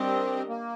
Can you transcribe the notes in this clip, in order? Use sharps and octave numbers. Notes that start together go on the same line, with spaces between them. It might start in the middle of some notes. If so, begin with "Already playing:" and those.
Already playing: G3 C4 D4 G4 A#4 D#5
A#3